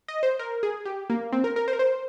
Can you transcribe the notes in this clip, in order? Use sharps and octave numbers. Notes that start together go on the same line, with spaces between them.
D#5
C5
A#4
G#4
G4
A#3
C4
A#4
A#4
C5
A#4
C5